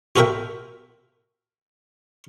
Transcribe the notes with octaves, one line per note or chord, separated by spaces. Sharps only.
F4 F#4 A4 A#4 E5 G5